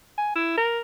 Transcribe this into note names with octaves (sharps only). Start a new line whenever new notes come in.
G#5
E4
A#4